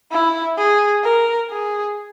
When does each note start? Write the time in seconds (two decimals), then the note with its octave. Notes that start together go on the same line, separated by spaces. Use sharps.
0.11 E4
0.58 G#4
1.03 A#4
1.50 G#4